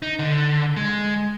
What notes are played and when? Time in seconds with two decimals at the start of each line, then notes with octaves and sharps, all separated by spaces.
0.02 D#4
0.19 D3
0.77 G#3